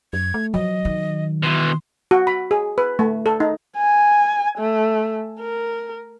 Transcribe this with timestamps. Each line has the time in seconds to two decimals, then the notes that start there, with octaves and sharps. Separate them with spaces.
0.13 F#2 G#6
0.34 A3
0.54 F3 F#3 D#5
0.85 D#3
1.43 B2 E3 C6
2.11 F#4
2.27 B5
2.51 G#4
2.78 B4
2.99 A3
3.26 A4
3.40 D#4
3.77 G#5
4.58 A3
5.40 A#4